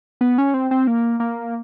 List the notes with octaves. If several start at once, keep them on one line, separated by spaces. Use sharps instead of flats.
B3
C#4
C4
C4
A#3
A#3